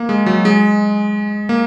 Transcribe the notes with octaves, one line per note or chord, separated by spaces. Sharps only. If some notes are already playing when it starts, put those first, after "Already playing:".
Already playing: A#3
G#3
F#3
G#3
A#3